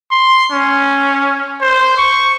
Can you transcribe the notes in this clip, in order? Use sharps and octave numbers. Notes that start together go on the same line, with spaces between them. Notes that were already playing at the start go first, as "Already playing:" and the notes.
C6
C#4
C5
C#6